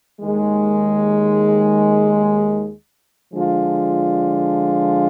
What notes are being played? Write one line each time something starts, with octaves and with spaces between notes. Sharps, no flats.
D#2 D#3 G#3
D3 F3 G#3 D4 F4